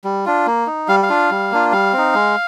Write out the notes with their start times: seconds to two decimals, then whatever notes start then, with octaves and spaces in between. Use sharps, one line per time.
0.04 G3
0.26 D4 F4
0.46 A#3
0.67 D#4
0.88 G3 F5
1.03 F5
1.09 D4 F4
1.31 G3
1.51 A#3 D4 F4
1.72 G3 F5
1.93 C4 D#4
2.15 G#3